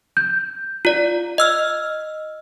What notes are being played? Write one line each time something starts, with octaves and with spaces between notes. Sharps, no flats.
G6
F4 D5
D#5 E6 F6